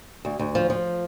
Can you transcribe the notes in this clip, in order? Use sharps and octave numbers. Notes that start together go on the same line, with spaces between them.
D2
D2
F3
F3